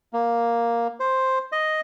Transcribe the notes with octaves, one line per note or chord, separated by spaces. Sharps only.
A#3
C5
D#5